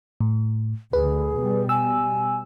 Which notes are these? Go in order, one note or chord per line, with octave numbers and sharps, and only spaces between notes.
A2
D2 D3 G#4 B4
B2 G3
G#5 E6